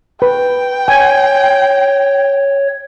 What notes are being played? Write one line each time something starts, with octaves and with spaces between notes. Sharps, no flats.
B4 G5
C#5 G#5